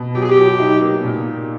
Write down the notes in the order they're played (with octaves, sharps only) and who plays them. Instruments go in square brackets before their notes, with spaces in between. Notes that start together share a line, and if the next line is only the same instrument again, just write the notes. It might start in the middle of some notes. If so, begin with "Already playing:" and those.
Already playing: [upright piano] B2
[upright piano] F#3 [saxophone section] G4
[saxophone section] G#4
G4
[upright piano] F#3
D#4
A#3
A#2